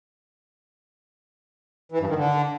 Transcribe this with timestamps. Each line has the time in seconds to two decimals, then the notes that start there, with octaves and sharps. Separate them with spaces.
1.92 E3
2.00 G2
2.09 D#3
2.17 D3